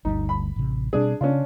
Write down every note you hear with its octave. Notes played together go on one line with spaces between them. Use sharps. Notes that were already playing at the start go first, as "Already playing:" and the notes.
G1 D2 G3 D#4
B5
A1 C3
B2 G3 C4 D4 G#4
C#3 C#4 D4 F4